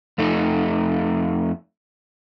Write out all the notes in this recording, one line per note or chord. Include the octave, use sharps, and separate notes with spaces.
F2 A3 D#4